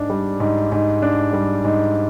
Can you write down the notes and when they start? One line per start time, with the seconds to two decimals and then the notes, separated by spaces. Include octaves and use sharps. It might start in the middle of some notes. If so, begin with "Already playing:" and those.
Already playing: G#2 D4
0.10 G3
0.40 G#2
0.72 G#2
1.02 D4
1.33 G3
1.64 G#2